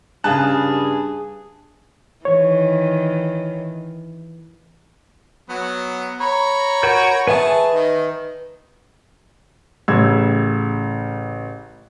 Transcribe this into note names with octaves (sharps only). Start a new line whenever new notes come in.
G2 C#3 G#4 G#5 A5 F#6
D#3 E3 C#5
F#3 B3
C#5 A#5 B5
F#4 A#4 G6
G#4 B4 E5 A5 C#6
D#3 D#4
A1 C#3 E6 G#6